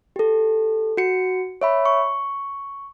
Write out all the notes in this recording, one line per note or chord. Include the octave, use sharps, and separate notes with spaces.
G4 A4
F#4 C#7
C#5 E5 B5
C#6